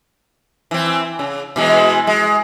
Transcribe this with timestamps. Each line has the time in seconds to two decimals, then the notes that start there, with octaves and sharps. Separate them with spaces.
0.71 E3 C4
1.19 C#3
1.56 B2 E3 G#3
2.07 G#3